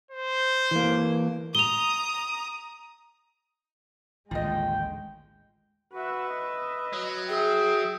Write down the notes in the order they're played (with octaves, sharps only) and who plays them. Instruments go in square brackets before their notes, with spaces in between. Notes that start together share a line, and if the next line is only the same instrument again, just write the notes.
[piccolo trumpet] C5
[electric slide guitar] E3 A#3
[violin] A#5 D#6 [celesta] F7 G7
[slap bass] A1 D#2 D3 [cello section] G#3 [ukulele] F4 D#5 [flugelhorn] G5
[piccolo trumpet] F#4 [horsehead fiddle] B4 E5
[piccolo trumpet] D#5
[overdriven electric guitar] F#3
[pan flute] G#4 [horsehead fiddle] E5 [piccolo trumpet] G5